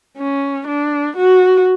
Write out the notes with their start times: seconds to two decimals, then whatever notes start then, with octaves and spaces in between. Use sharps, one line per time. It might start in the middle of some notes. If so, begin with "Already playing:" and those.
0.17 C#4
0.67 D4
1.16 F#4